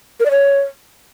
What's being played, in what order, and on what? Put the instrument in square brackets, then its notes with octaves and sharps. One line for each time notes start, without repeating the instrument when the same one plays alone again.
[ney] A#4
D5
C#5